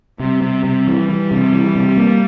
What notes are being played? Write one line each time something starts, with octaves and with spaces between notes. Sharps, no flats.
C3 G3
C3
C3
E3
E3
C3
E3
C3
A#3